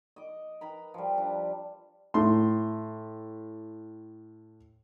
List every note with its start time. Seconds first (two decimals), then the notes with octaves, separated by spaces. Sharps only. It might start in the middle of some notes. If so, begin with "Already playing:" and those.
0.16 D#5 D6
0.61 A#4 B4 A#5 B5
0.94 F3 G3
1.18 D4
2.14 A2 C6